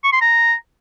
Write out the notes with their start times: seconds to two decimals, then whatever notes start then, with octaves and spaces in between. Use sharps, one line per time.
0.04 C#6
0.13 C6
0.22 A#5